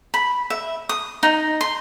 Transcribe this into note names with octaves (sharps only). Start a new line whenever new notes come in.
B5
E5
D#6
D#4
C6